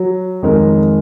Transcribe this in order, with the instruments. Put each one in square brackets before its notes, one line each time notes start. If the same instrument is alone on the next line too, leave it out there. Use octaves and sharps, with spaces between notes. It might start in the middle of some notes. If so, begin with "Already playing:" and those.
Already playing: [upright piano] F#3
[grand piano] F2 D#3 G#3 D#4 A#4